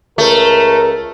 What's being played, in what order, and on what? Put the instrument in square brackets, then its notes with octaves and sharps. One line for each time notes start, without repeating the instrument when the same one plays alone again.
[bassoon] C#2 [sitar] A3 [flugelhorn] A#4